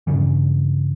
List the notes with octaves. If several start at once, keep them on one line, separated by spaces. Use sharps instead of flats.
G2 C#3 E3